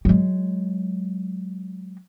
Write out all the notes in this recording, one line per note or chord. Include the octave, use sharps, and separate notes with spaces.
F#3 G#3